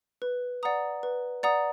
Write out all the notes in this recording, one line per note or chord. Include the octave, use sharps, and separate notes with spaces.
B4
D5 F#5 A#5 D#6
B4
D5 F#5 A#5 D#6